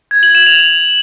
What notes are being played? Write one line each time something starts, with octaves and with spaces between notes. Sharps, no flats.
G#6
F#7
E7
F7